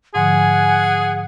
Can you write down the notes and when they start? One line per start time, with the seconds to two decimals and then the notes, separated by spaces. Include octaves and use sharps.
0.15 G#2 D3 F3 G#4 F#5 G#5